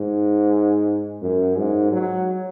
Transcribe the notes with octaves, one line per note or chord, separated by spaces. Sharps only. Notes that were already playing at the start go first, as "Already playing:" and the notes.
Already playing: G#2
F#2
G#2
F#3